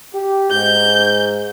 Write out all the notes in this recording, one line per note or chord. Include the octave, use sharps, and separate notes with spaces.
G4
G#2 G6